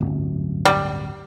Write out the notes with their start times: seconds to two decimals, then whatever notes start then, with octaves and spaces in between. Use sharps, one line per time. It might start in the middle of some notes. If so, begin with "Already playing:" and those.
0.01 D1 G1 F#2
0.65 G3